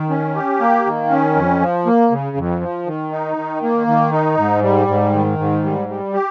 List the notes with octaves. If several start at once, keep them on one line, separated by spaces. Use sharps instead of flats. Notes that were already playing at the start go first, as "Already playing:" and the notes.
Already playing: D#3
C#4
G4
A#3
D#3
C#4
F2
F3
A#3
C#3
F2
F3
D#3
D#4
D#3
A#3
D#3
D#4
G#2
G3
G#2
D#3
G#2
G3
G3
G4